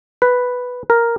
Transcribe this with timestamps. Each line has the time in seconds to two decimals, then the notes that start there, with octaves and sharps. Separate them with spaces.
0.22 B4
0.90 A#4